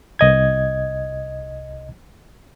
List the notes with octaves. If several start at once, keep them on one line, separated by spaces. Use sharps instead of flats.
C2 D#5 G#6